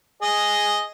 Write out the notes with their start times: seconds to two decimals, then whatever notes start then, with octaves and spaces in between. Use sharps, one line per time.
0.22 G#4 D#5